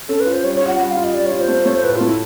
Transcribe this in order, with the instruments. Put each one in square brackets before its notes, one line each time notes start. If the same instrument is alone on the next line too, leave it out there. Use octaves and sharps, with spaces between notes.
[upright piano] C#4 [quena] A4
[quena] B4
[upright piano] F4
[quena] C5
[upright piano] G3 [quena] C#5
[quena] C#5
[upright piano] F4
[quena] F#5
[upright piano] G3 [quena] F#5
[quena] F5
[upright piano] F4
[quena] D#5
[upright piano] G3 [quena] D5
[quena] C#5
[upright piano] F4
[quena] C#5
C5
[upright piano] A3
[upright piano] A3 [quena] C#5
[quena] C5
[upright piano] A2 [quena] B4
[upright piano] A3 [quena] F4
[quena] E4